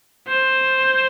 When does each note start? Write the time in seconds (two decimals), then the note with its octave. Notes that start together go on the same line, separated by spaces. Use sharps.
0.28 C5